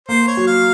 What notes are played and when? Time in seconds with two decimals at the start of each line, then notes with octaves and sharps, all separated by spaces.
0.08 A#3 C5
0.28 C#5
0.37 F#3
0.47 F5